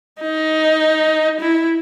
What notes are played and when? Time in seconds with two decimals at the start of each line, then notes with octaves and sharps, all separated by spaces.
0.21 D#4
1.40 E4